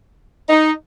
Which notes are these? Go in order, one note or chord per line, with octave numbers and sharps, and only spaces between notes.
D#4